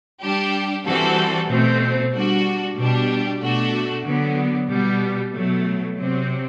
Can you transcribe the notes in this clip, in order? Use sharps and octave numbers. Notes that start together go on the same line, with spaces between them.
G3 D4 G4
E3 G3 C4 F#4 A4
B2 A3 C4
G3 D4 F#4
B2 G3 D4 G4
B2 A3 D4 F#4
D3 F#3 B3
B2 G3 B3
B2 F#3 A3
C3 F#3 C4